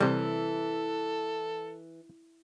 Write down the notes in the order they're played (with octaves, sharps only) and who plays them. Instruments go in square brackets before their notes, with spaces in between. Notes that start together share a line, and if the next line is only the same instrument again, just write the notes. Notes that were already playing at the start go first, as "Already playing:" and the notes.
[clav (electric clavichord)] C3 G3 [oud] E3 [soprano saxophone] A4